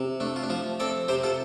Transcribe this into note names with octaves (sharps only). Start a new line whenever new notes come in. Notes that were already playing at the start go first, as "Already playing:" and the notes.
Already playing: C3
A3 D4
F4
D4
F3 F4
C4 A4 D5
C3 G4 C5
F4 A4